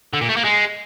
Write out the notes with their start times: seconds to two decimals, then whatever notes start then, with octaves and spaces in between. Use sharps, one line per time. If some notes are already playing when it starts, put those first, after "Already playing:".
0.13 D3
0.21 A#2
0.29 A3
0.37 A#3
0.44 G#3